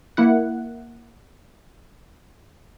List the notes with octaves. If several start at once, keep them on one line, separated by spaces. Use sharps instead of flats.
A#3 E4 F#5